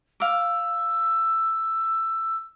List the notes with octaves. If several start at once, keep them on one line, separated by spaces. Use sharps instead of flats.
F5 D6 E6